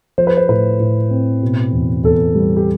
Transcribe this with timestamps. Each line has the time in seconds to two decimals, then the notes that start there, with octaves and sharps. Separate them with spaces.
0.18 F3 C5
0.27 B4
0.37 C5
0.49 A2 B4
0.80 A2
1.10 C4
1.43 B2
1.73 E2
2.04 E2 A4
2.35 G3
2.57 G4